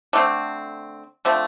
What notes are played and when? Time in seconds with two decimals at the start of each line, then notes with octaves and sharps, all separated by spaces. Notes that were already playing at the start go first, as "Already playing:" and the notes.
0.13 D3 A3 C4
1.25 D3 F3 A3 C4